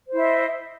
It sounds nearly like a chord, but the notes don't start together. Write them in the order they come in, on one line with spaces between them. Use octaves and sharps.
C5 E4 E5 D#5